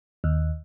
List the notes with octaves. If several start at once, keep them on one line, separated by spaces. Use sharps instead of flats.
D#2